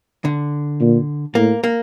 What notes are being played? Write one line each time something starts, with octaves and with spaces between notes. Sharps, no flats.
D3
A#2
A2 A#3
A#3